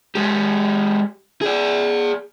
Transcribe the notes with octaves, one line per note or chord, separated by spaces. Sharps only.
G#3 G4
G#4 D5